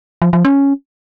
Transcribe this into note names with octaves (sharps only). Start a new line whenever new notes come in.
F3
F3
C#4